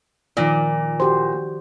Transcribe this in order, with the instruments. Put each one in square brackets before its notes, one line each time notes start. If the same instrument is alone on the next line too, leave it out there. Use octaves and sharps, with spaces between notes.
[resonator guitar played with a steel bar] A#2 [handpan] D#3 F3 D5
[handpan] F#4 G4 C5